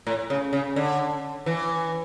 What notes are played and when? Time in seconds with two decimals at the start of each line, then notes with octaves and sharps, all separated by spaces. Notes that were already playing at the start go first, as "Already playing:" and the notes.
0.07 A2
0.30 C#3
0.53 C#3
0.76 D3
1.46 E3